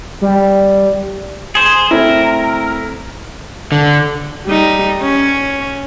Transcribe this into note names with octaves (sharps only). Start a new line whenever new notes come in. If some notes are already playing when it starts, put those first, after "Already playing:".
G3
G#4 C5
A3 C4 E4 A#4
D3
G3 D#4
C#4